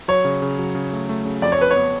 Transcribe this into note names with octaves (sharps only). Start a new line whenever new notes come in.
F#3 C#5
C#3
C#3
F#3
C#3
A3
A3
C#3
F2 D5
C#5
F2 B4
C#5
B3